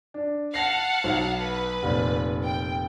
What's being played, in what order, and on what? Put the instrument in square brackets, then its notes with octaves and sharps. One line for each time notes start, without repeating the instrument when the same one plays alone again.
[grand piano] D4
[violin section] F5 F#5 A5 [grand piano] A#6 C7
[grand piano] B1
[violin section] B4
[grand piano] F1 A#2
[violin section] G5